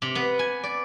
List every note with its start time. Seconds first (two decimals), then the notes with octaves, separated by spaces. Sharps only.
0.02 C3
0.15 B3
0.39 G#5
0.64 D5